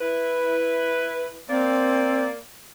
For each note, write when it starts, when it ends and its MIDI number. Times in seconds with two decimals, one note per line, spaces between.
0.01 1.38 64
0.01 1.38 71
1.49 2.37 58
1.49 2.25 60
1.49 2.37 74